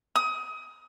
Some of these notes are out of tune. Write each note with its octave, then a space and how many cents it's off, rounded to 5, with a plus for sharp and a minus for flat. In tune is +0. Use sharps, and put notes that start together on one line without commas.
D#6 +25